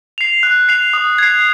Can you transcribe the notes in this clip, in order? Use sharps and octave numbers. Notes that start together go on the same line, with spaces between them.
C7 F7
F#6
C7 F7
D#6
G#6 C7